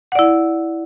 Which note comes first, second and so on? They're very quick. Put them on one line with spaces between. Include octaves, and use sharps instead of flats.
F#5 D5 E4